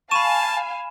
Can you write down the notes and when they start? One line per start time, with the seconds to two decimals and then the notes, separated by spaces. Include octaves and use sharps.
0.11 F5 G#5 A5 B5 C#6 D#7 E7